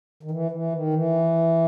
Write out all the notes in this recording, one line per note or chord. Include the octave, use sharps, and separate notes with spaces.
D#3
E3
E3
D#3
E3